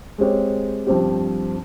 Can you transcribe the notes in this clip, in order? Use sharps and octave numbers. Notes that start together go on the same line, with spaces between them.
G#3 C4 G4 C#5
G2 F3 C4 G4